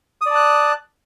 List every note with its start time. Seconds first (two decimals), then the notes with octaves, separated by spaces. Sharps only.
0.21 D#6
0.26 D5
0.31 A5
0.35 F#6